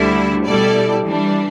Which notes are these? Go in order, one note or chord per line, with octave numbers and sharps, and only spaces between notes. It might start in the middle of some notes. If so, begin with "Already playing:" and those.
Already playing: D2 D3 G3 E4
B2 G3 E4 A4 D5
E3 G3 D4